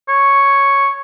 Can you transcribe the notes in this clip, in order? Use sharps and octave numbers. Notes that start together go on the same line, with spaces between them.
C#5